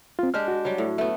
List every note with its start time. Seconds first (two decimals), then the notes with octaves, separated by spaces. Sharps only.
0.19 C4 F4
0.34 G#3 D4 G4 F6
0.48 F#4
0.65 F#3 G3
0.78 A2
0.98 A3 B3